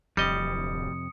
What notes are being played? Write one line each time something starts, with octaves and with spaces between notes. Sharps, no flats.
D1 F2 C3 G3 D#5 D#6 C#7